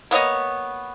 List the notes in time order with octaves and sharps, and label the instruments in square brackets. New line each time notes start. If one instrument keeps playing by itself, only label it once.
[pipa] A#3 B3 C#5 D#5